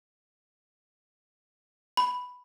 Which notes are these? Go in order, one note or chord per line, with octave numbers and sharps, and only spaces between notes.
B5